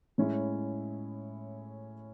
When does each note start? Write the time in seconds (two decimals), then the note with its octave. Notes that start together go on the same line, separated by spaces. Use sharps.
0.18 A2 G#3 C#4 E4